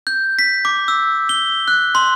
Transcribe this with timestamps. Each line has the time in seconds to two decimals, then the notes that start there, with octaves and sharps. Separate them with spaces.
0.07 G6
0.39 B6
0.65 D6
0.88 E6
1.29 G7
1.68 F#6
1.95 C6